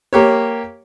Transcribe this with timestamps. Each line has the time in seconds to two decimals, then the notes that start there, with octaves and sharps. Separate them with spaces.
0.13 A#3 G4 C#5